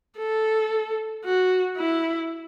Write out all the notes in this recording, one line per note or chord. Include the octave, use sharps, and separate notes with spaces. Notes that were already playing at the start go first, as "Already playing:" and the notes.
A4
F#4
E4